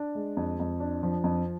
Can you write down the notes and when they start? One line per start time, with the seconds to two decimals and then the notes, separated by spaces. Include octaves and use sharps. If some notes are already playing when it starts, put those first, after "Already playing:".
Already playing: D4
0.15 G#3
0.37 F2
0.60 F2
0.80 D4
1.03 F3
1.24 F2